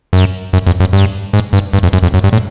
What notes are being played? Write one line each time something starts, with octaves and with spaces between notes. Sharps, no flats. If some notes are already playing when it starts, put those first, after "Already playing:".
F#2
F#2
F2
F#2
G2
G#2
G2
G2
F2
F#2
F2
F#2
G2
A2